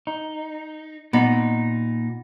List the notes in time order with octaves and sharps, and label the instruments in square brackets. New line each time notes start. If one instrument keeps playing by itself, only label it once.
[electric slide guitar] D#4
[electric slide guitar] A#2 D#4 [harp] B3